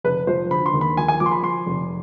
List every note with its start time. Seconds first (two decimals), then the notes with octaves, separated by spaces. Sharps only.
0.04 F1 B4
0.27 F3 C5
0.50 D3 B5
0.66 C6
0.73 D#2
0.81 B5
0.97 F3 G#5
1.08 G#5
1.20 F3 D6
1.26 C6
1.31 B5
1.43 F3 C6
1.66 F1